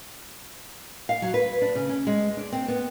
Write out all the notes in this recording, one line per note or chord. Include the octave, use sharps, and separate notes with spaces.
F5
F#3
B4
D4
C#3
C#4
G#3
D4
C4
B3